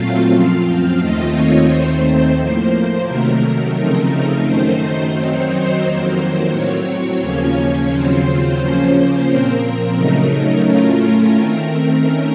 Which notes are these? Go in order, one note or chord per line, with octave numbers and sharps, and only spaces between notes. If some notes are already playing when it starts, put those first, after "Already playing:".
Already playing: A#2 F#3 A3 C4 F4 F5
F#2 F3 C4 F4
D#2 D#3 A3 C4 F4 D#5
C#5
D#2 D#3 A3 C4 C5
A2 F3 A#3
C3 D#3 F#3 A3 A#4
C#3 F3 A3 C4 D#4
F#2 D#3 A3 D#4 C5
C5
F#2 D#3 F#3 C4 D#4 C5
F2 D#3 F#3 A#3
A2 F#3 C4 C#5
D#2 C#3 F3 A#3 C#4
D#2 C#3 F#3 C4 F4 C5
C#3 F3 A#3 C#4
A#2 F3 C4 A#4
C#3 F#3 A3 D#4
A2 A3 C#4 F4
D#3 A3 C4 A#4
D#3 A3 C#4